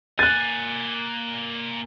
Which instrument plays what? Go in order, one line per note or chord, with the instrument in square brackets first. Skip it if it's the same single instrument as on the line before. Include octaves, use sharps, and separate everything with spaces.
[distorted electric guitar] A#3 G#5 [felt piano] F#6 A6